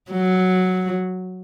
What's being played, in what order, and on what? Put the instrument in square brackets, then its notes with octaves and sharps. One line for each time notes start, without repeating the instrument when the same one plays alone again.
[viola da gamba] F#3